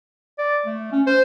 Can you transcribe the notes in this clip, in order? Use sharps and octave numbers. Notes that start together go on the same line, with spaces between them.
D5
A3
C#4
C5